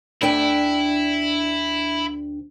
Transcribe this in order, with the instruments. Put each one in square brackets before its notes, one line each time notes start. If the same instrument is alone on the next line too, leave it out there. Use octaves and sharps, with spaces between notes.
[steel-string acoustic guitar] D2 D4 G5 [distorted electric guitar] E4